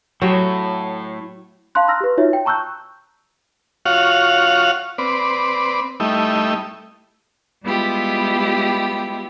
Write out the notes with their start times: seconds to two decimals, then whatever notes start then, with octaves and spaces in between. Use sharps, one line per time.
0.22 A2 F#3 F#4 G4
1.75 F5 A5 B5 C6 F#6
1.88 A#5 C6 E6 F6 A#6
2.01 G4 B4
2.17 D#4 F4 F#4 C#5 E5
2.33 G5
2.45 A5 A#5 C#6 E6 F#6 G6
3.86 F4 F#4 C#5 F5 F#5
4.98 C4 B4 D5
6.00 G3 A3 D#4 E4
7.63 G3 G#3 B3 E4 F4 G4